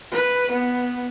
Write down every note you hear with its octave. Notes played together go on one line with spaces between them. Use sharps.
B4
B3